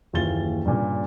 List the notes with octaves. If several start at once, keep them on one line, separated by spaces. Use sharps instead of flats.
F#1 D#2 E3 F4 A6 G7
G2 A#2 C#3